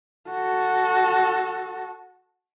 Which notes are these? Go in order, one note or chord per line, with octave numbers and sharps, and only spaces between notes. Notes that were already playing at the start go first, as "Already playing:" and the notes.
F#4 A4